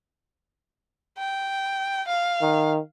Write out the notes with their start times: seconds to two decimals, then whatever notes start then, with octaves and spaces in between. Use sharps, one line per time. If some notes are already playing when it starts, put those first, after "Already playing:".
1.18 G5
2.08 F5
2.41 D#3